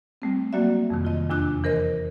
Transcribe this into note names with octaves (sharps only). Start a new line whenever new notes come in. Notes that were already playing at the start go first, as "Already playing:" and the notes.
G3 A3 C4
F#3 A#3 F#4 D5 E5
F2 C3 D#3
F4 D#5
E2 C3 D4 F4 D6 F#6
E3 A#4 C5 D#5